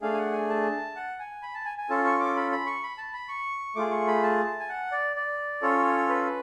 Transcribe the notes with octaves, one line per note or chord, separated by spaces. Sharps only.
A3 D4 G#4 F5
G#5
F#5
G#5
A5
F#5
G#5
B5
A5
G#5
G#5
C#4 F4 A4 A5
C#6
D6
B5
B5
C#6
B5
A5
B5
C#6
A3 F4 G#4 D6
C#6
B5
A5
G#5
F#5
D5
D5
C#4 F4 A4 C#5
B4